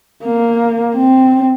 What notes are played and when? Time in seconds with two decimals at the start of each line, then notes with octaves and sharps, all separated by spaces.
0.25 A#3
0.96 C4